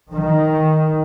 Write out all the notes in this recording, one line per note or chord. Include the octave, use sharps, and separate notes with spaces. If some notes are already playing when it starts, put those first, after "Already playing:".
D#3